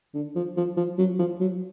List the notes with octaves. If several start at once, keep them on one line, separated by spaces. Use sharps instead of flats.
D3
F3
F3
F3
F#3
F3
F#3